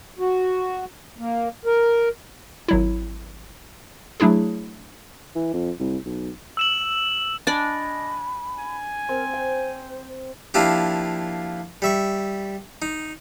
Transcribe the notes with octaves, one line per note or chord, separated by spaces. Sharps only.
F#4
A#3
A#4
G#1 F#3 E4
F#3 A3 D4 E4 G#4
E3
F2
C2
B1
E6 E7 F#7
D4 D5 D#5 G#5 B5
G#5
C4 A#4
C5 G5
F3 A#3 D4 E4 F4 G4
G3 E5 C#6
D#4